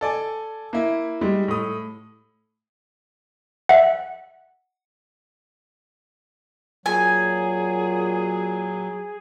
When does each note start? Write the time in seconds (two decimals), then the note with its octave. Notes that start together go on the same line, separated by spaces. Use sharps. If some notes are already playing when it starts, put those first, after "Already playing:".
0.01 A4 D5 G#5
0.73 A#3 E4
1.21 G3 G#3
1.48 A2 D#6
3.69 E5 F#5
6.86 A#2 F#3 G#4 G#5